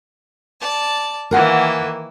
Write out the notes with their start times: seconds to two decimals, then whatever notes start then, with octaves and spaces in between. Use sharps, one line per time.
0.60 D5 A5
1.31 D#3 E3 A#3 A#4 F#5 G#5